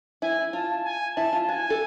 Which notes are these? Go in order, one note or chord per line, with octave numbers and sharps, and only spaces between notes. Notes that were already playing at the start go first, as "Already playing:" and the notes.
E4 G#5
F4 A5
G#5
E4 A5
F4
F#4 G#5
A4